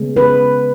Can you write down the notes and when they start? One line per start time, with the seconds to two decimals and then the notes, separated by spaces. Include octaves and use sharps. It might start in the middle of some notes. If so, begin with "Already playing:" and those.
Already playing: C#3 G#3 B3
0.16 B4